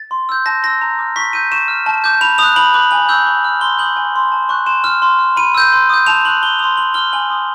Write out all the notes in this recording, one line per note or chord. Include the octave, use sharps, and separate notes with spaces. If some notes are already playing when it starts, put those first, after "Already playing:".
Already playing: A6
C6
E6 G6
A5 A#6
C6 E6 A#6
A#5
D6 F6
C#6 B6
E6 G6 D#7
C#6 E7
F6
A5
D6 G6
B5 F7
D#6 F#6 F7
B5 F#7
D6 F#6 F#7
G#5 F#7
C#6 E6 G6
C#6
F6
C6 G7
D#6 G6 F#7
G#5
C6 E6
A5
C#6 F#6
C6 E7
F6
C6
F6
B5 D#7
E6 G6
C6
D#6 G6
A5 F7
C#6 F#6 F#7
A5 G7
C6 D#6 F7
C6 F#7
F6 G7
G#5 F#7
C6 D#6